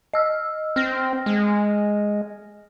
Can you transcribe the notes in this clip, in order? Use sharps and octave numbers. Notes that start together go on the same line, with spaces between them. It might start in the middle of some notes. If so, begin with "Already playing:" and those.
D#5 E6 F6
C4 F6 A#6
G#3